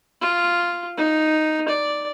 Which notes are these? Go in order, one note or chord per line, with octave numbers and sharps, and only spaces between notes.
F4
D#4
D5